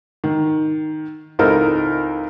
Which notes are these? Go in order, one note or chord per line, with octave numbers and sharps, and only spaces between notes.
D#3
C#2 C4 D#4 E4 A4 A#4